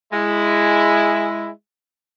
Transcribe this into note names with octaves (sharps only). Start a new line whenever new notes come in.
G#3 E4